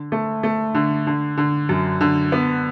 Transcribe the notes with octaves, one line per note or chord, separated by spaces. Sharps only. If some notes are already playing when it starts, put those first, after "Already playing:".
Already playing: D3
A3
A3
D3
D3
D3
F#2
D3
B3